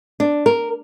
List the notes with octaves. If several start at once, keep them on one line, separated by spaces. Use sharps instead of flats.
D4
A#4